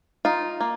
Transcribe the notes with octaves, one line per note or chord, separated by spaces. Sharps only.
D#4 F4
A#3